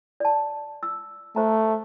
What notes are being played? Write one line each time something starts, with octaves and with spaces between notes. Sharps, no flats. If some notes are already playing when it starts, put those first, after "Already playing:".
D5 A5
E6
A3 C5 A#5